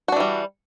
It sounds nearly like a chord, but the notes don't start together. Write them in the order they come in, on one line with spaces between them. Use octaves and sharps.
F#4 D4 E3 G3